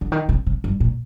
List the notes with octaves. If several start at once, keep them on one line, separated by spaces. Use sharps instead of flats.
D3
D#3
C3
C3
G2
A#2